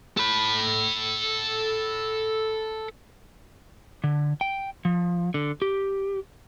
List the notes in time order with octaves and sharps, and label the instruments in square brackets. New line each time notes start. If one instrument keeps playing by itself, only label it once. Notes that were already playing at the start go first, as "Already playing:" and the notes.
[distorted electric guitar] A4 B5
[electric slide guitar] D3
G5
F3
D3
G4